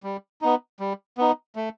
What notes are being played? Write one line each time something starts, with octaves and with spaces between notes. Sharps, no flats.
G3
B3 D#4
G3
B3 D#4
A3